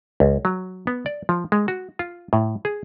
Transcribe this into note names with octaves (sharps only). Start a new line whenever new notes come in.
C#2
F#3
B3
D5
F3
G#3
F#4
F4
A2
G#4